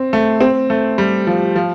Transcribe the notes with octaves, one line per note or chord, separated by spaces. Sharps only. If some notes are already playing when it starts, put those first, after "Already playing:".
Already playing: C4
A3
C4
A3
G3
F3
F3